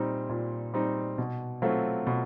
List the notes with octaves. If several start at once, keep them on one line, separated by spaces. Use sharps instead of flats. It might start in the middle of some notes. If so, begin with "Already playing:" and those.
Already playing: A#2 G3 C4 D#4
A#2
G3 C4 D#4
B2
F#3 A3 C4 F4
B2